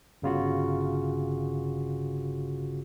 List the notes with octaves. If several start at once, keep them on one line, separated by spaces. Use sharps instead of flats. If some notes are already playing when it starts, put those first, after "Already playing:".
G1 C#3 F4 F#4